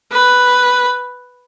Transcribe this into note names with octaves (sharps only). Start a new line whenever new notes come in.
B4